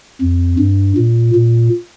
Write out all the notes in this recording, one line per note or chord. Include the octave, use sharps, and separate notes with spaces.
F2
G2
A#2
A#2